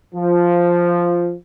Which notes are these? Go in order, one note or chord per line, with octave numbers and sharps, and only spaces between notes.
F3